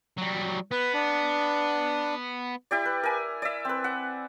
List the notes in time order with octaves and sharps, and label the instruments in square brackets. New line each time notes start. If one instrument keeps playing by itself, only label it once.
[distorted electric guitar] F#3 G3
[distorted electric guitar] B3 [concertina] B4
[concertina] D4
[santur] E4 G4 D5
B4
A#4 G#5
D5 E5
C4 B4
F#5